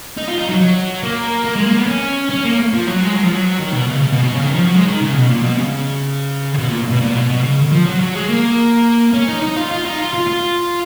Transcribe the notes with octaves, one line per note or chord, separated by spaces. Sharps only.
D#4
F4
D#4
F#3
F#3
A#3
A#3
G#3
A#3
B3
C#4
C#4
A#3
F3
F#3
G#3
F#3
F3
F#3
D#3
B2
C#3
C#3
B2
B2
C#3
D#3
F3
F#3
G#3
D#3
C#3
B2
A#2
B2
C#3
B2
A#2
B2
A#2
B2
B2
C#3
F3
F#3
F#3
G#3
A#3
C#4
D#4
D#4
F4
F4
D#4
F4
F4
F4